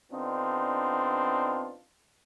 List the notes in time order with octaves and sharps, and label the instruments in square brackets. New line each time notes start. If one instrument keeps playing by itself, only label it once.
[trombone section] D3 B3 C4 D4 D#4 F4